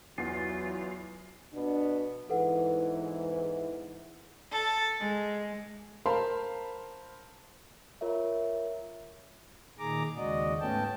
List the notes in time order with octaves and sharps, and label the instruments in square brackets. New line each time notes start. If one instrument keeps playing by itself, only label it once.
[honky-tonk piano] E2 [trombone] F#3 [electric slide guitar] F4
[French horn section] B2 B3 D4
[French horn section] E2 G#2 E3 [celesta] A4 B4 F#5
[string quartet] A4
G#3
[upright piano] A#4 C5 F5 A5 B5 C6
[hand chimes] F4 A#4 C#5 E5
[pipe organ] A#2 D#3 G#4 A#5 D6
D#2 C#3 G#3 F#4 D5 D#5
G#2 A3 B3 C#4 G5 A5